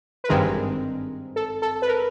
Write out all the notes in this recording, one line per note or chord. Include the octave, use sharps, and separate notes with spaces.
B4
G#1 G2 D#3 G#3 C4 A#4
A4
A4
B4
A#4